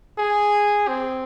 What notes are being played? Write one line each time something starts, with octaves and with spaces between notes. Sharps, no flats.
G#4
C4